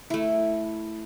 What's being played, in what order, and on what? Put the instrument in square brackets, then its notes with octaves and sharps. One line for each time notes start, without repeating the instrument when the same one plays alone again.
[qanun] A3 E4